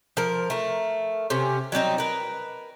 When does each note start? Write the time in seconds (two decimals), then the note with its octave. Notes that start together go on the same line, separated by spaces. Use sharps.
0.17 F3 A#4
0.50 A3 A#4
1.30 C3 C#4
1.72 F#3 G3 C4 D#4
1.98 A#4 B4